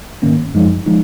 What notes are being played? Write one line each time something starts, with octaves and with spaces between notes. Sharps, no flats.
G#2 D#3 A#3 C#4
F#2 F3 G#3 D#4
F3 G#3 D#4